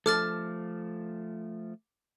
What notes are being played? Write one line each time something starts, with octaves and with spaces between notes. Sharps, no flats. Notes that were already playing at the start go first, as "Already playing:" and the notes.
F3 A3 A4 D6 F6 A6